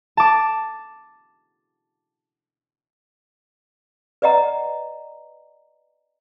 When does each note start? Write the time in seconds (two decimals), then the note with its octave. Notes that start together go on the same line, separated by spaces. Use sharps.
0.17 A5 D6
4.22 B4 D5 D#5 F#5 A#5